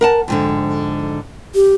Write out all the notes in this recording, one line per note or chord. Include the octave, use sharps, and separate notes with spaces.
A#4 F#5 A5
F2 G#2 D3
G4